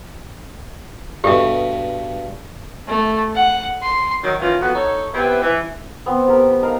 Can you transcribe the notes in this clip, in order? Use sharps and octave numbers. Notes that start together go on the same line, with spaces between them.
G2 B2 G4 A4 E5
A3
F#5
C6
D#3 F#3
D#3 E3 A#3 C#4 F4
F2 B3 F#4
D#4 A4 C#5
B3 C4 E4 G4 B4
E3
B3 C4
B3 G4 A#4
B4
D#4 A#4 D#5 F5